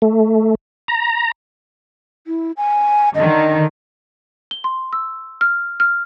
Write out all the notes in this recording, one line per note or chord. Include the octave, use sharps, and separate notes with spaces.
A3
A#5
E4
G#5
D3 D#3 D#5
G7
C6
E6
F6
F6